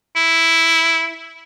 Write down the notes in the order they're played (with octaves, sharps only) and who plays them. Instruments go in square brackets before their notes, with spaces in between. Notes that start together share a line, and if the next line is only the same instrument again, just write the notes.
[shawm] E4